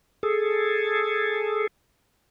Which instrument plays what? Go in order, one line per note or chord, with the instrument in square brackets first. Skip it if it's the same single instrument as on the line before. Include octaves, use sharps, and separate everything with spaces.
[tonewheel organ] G#4 A4